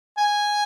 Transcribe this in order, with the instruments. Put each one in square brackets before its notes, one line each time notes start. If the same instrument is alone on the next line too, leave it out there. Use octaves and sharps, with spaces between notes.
[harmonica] G#5